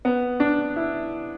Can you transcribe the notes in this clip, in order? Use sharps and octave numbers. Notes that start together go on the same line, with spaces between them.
B3
D4
E4